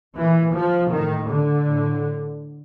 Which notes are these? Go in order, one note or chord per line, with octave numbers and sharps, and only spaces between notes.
A#2 E3
F3
A2 D#3
D3
A2